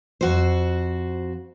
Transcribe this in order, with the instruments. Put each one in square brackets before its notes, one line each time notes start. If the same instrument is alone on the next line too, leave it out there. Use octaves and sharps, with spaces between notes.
[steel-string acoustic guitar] F2 F#4 C5